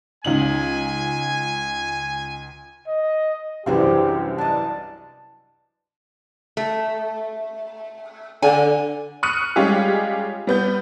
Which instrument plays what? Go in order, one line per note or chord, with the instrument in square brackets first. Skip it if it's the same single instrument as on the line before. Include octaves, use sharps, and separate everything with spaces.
[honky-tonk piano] C#2 D#4 F#7 [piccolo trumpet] G#5
[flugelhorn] D#5
[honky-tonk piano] C2 F#2 E3 [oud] C#3 C4 D4 [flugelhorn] G4
[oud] D4 D#5 [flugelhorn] A5
[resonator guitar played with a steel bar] A3
[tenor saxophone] D3 [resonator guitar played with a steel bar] G#5
[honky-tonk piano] C#6 D#6 F6 F#6 C#7 D#7
G3 G#3 C#4 F4 G4 G#4
G3 B3 G6